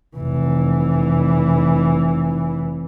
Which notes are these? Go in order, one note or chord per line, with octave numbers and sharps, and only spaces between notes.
F1 E3